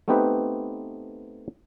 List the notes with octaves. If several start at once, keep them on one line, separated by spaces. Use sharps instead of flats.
A3 B3 C4 D#4 G4 B4